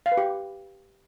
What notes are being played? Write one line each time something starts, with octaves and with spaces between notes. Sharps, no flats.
F5
B4
G4